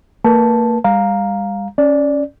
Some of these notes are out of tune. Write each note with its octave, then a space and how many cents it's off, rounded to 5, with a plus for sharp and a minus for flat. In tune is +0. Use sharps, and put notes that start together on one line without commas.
A#3 -35 B4 -40 A5 +0
G3 +35 F5 +10 A#5 +0
C#4 +0 D5 +0